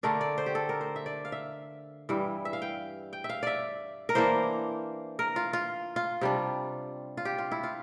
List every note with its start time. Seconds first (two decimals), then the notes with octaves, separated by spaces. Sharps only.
0.03 D3 A3 D4 A#4
0.21 D5
0.38 C5
0.46 G4
0.55 A4
0.69 A#4
0.81 C5
0.96 E5
1.06 D5
1.25 F5
1.32 E5
2.09 G2 E3 G3
2.45 E5
2.53 F5
2.62 G5
3.13 G5
3.24 E5
3.29 F5
3.43 D5 E5
4.09 A#4
4.15 E3 A#3 D4 C5
5.19 A#4
5.36 F4
5.53 F4
5.96 F4
6.21 C3 G3 D4
7.17 F4
7.25 G4
7.38 F4
7.51 E4
7.63 F4